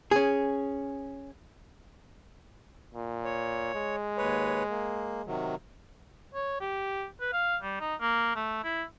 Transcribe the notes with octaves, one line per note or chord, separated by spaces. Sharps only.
C#4 G#4
A#2
C#5
G#3
D#2 B4 C#5
A#3
C3 D#3 F#3
C#5
G4
B4
F5
G3
D#4
A#3
A3
E4